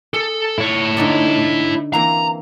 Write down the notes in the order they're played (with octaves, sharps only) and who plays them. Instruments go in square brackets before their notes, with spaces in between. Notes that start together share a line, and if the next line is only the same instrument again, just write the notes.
[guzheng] G#4 [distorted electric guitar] A4
[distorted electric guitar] E4 C#5
[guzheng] D3 D#4 D5
[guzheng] E3 A#3 C4 [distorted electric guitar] A#5